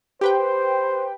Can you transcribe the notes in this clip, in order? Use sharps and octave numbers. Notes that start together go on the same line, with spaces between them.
G4 B4 C5 G5